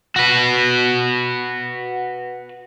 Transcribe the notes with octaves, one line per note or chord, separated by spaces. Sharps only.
F#4 B4